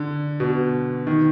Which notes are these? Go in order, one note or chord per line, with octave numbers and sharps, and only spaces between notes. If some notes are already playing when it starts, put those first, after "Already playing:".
Already playing: D3
B2
D#3